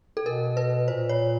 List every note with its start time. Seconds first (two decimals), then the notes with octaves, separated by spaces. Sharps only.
0.17 A4
0.26 B2 A#4
0.57 B4
0.88 A#2 C5
1.09 C#5